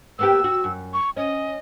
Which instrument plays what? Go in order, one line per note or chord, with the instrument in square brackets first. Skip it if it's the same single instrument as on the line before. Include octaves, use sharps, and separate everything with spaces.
[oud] A#3 B3 G4 [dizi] E6
[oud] F#4
F#2
[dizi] C#6
[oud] C#4 [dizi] D#5